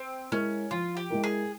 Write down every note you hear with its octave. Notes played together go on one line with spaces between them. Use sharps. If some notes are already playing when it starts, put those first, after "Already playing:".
Already playing: C4
G#3 C#4 E4 A#4
F3 F4
G4
G#3 E4 A#4
G#4